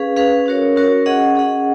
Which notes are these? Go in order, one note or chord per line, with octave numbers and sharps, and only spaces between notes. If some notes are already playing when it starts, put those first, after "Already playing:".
Already playing: C#4 G#4 B4 F5
C#4 G#4 B4 F5
C#4 F#4 A#4 C#5
C#4 F#4 A#4 C#5
C#4 G#4 D#5 F#5
C#4 G#4 D#5 F#5